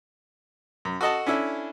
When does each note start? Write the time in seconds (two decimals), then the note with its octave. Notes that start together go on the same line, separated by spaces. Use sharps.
0.85 F#2
1.01 F#4 A4 D#5 F#5 A5
1.26 C#4 D4 E4 A4